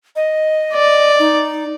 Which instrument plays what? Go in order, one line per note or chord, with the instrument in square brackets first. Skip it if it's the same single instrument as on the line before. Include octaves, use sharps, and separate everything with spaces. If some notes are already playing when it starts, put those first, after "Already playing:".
[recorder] D#5
[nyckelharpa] D5
[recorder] D#4